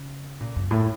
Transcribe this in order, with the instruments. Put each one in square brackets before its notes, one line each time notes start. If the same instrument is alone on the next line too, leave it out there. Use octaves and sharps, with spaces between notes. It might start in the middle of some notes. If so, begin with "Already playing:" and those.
Already playing: [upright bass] C#3
A#2
F#2
A2